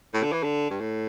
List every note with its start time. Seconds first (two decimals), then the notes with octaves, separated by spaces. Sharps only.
0.14 A2
0.23 D3
0.32 E3
0.43 D3
0.70 G2
0.80 A2